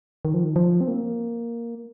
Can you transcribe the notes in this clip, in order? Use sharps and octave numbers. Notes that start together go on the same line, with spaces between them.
D#3
F3
D#3
F3
C4
A#3